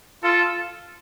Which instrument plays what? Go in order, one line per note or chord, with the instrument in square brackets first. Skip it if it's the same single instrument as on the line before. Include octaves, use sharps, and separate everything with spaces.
[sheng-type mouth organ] F4 [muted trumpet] A4